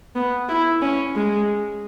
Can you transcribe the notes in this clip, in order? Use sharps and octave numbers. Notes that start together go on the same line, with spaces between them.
B3
E4
C#4
G#3